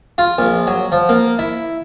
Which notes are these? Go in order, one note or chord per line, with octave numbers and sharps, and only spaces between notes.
F4
A#1
F#3
F3
A#3
E4